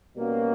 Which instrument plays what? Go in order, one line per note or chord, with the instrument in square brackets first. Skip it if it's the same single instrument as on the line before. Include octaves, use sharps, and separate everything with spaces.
[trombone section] B2 G3 A#3 C#4 F#4